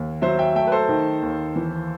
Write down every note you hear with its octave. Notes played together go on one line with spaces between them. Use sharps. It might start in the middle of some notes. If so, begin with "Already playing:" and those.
Already playing: D#2
F#3 C5 E5
E5 G5
A3 E5 G5
B4
A4 C5
D#3
D#2
E3